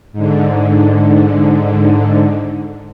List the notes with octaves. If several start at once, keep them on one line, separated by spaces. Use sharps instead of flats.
G#2 D3